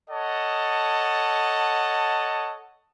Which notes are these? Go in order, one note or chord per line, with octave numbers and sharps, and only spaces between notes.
A4 C#5 D#5 F#5 A5